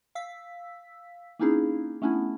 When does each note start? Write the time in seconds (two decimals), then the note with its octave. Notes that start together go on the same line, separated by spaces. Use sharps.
0.15 F5 E6 B6
1.39 A#3 C4 C#4 D#4 E4 G#4
2.02 A3 B3 C#4 D4 E4